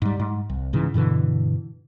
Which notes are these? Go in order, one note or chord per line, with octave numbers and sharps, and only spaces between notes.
G#2 G3
G#2
C2
G#2 C#3 E3
G2 B2 D3 E3